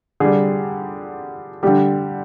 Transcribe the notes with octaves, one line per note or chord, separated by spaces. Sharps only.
D3 G3 G#4
D3 G3 G4